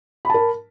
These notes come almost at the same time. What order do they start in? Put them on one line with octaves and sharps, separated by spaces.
B5 A5 A#4